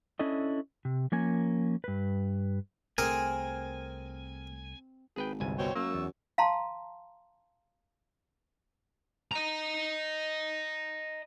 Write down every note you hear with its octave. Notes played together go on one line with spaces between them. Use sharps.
C#4 D4 E4 A4 D#5
C3
F3 A#3 C#4 A#4 G#5
G2 B4
C2 A3 C4 G#4 A#4 G#5
G#1 G#4 B4 G5
G1 C2 G#5
B2 C5 C#5 G5
F#2 A#3 C#6 E6
E2
F5 A5 A#5 C6
D#5 A#5